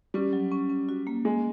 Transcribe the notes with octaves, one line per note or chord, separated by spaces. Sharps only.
G3 C#4
F#3
C#4
C#4
F#4
A#3
G#3 A#3